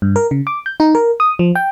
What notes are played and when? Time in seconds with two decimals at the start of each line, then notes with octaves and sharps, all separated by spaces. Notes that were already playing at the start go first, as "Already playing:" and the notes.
0.02 G2
0.16 A#4
0.31 C#3
0.47 D6
0.66 G6
0.80 D#4
0.95 A#4
1.20 D#6
1.39 F3
1.55 G5